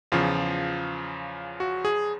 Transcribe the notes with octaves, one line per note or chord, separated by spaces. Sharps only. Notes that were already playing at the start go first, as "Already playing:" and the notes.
E2 C#3 F3 F4
F#4
G#4